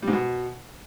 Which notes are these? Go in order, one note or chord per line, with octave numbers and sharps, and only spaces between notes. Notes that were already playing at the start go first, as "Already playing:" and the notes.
G3
G#2
B2